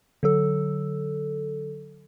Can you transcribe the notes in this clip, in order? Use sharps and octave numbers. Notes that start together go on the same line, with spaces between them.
D3 F#3 A4